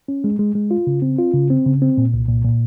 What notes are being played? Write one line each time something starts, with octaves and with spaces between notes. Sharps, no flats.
C#4
G#3
G#3
G#3
F4
C#3
C4
F4
C#3
C4
C#3
C4
A#2
C2
A#2
A#2